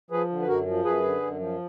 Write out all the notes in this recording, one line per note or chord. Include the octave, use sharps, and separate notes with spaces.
F3 G#4 B4
D3
B4
F#2 F#4 A#4
F3
F#2 G#4 B4
D3
F#2
F3